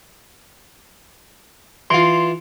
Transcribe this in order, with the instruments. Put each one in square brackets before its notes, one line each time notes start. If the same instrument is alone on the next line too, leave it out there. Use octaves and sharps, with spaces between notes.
[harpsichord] E3 F4 [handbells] C6